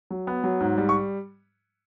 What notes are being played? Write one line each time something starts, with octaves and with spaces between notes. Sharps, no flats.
F#3
B3
F#3
G#2
G3
C#6